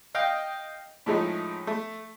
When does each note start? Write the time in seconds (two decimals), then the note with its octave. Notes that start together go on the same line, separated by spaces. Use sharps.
0.15 D#5 F5 G5
1.06 A2 F3 G#3 A3 D#4
1.67 A3